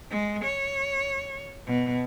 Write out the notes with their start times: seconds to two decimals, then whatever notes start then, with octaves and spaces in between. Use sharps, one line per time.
0.10 G#3
0.44 C#5
1.67 B2